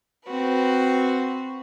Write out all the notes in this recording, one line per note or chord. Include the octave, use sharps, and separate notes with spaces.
C4 F#4 B4